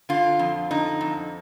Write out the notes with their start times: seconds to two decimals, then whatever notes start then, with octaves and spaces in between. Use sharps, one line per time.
0.09 D3 F4
0.39 F2
0.71 D3 D#4
1.01 F2